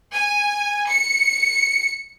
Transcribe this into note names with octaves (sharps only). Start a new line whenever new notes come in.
G#5
C#7